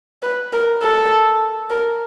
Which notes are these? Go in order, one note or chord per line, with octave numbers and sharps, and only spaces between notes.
B4
A#4
A4
A#4